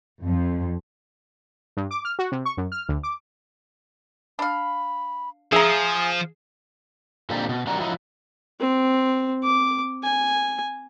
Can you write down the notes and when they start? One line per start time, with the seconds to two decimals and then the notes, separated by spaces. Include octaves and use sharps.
0.25 F2
1.77 G2
1.91 D6
2.05 F6
2.19 F#4
2.32 C3
2.45 C#6
2.57 F#2
2.72 F6
2.89 D2
3.03 D6
4.39 D4 F5 B5
5.52 F3 G#4 E5 G#5 A#5
7.30 A#2 D3 C4 D#4 G4 A5
7.49 B2
7.67 E2 D#3 G3 D4 F#4 A#5
7.80 F3 F#3 D#4 E4 D#5
8.60 C4
9.44 D6
10.03 G#5